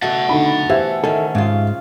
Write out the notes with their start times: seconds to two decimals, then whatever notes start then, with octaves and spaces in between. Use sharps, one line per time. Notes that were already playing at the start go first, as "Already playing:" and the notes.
0.02 B2 A3 F#5 A5
0.29 D3 D#4 B5
0.69 E3 G4 C5 E5
1.04 D#3 C#4 A4
1.35 G#2 C#3 F4